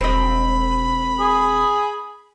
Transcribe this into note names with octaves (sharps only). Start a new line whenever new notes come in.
E1 C4 D#5 B5
G#4 D#6